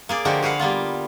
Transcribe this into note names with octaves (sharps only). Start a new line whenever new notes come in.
A#3 G#4 D5
D3 F3 G#3 F#4 G4 A#4
F#4 G#4 B4 F5 F#5
G3 A#3 B3 F4